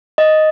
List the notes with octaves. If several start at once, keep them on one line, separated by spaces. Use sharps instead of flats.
D#5